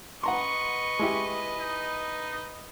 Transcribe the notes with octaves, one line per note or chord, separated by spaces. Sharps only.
B4 D#5 F#5 A#5 C6 C#6
G#3 E4 G4
D#4